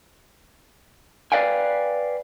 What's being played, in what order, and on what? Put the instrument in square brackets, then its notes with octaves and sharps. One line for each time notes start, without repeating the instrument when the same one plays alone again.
[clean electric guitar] B4 C5 D5 F5 G5 G#5